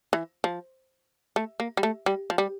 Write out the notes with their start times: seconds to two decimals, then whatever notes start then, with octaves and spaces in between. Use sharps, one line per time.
0.13 E3
0.44 F3
1.36 A3
1.60 A#3
1.77 G3
1.83 A3
2.06 G3
2.30 F3
2.38 G3